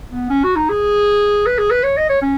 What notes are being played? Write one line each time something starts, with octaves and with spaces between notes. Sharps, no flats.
B3
C#4
F#4
D#4
G#4
B4
G#4
B4
C#5
D#5
C#5
C#4